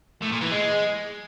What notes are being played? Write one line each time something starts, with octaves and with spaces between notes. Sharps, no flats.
A2
A#2
E3
G#3